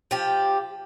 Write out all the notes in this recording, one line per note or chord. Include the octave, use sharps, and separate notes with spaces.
F3 G4